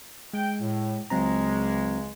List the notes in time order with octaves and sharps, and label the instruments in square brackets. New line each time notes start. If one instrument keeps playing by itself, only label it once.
[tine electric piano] G#3 [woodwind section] G5
[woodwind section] A2
[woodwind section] C#2 C#3 G#3 [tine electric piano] F#3 C4 A#5